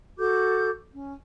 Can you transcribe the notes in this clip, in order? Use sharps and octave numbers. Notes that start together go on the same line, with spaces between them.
F#4 A4 D6 G6
C#4